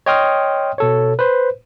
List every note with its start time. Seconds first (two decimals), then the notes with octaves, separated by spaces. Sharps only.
0.06 C#5 D#5 G5 C6 D#6 F6
0.78 B2 A4 C#5
1.19 B4 C5